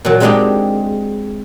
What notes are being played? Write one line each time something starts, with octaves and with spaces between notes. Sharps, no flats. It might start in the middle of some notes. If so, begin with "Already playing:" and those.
A#2 F#3
G#3 C4 D4 D#4 G4 G#4